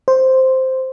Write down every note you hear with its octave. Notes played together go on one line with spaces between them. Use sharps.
C5